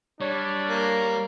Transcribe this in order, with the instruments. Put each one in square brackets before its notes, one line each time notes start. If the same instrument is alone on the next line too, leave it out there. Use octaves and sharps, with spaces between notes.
[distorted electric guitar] G3 [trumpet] D4 [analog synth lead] C#5
[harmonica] A#3